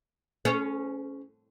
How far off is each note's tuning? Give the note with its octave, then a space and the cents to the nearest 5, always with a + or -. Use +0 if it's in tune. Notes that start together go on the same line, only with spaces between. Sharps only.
C#4 +0 G#4 +40 C5 -35